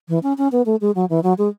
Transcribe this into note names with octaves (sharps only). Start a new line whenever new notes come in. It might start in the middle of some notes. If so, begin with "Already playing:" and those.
E3
C#4
C#4
B3
A3
G#3
F#3
E3
F#3
G#3